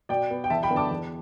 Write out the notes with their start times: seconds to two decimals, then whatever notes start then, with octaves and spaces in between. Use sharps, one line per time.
0.09 B2 D5 G5
0.30 B3
0.44 G5
0.50 E2 E5 A5
0.63 G5 B5
0.70 D3 B3
0.76 A5 D6
0.91 E2